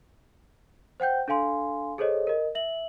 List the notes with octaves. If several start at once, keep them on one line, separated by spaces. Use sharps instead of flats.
C5 F#5 G5 G6
D4 A4 F5 G#5 C6
G#4 A4 C5 C#5 D#5
A#4 D#5
E5 F#7